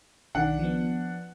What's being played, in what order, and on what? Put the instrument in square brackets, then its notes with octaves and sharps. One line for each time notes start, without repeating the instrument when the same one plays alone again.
[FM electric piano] B1 D#3 [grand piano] D4 F#5
[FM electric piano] F3 B3